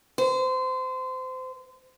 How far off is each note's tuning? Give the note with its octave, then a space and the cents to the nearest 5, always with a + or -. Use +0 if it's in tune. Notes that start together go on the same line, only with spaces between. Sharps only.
C5 -25